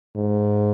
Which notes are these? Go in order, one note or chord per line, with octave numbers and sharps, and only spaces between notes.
G#2